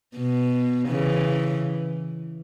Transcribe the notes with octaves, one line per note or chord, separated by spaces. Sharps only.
B2
C#3 E3